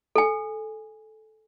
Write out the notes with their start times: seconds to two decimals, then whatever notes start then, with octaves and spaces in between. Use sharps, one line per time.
0.16 A4 G#5